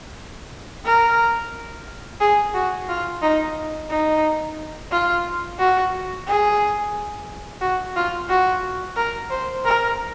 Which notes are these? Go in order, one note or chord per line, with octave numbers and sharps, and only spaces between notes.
A#4
G#4
F#4
F4
D#4
D#4
F4
F#4
G#4
F#4
F4
F#4
A#4
C5
A#4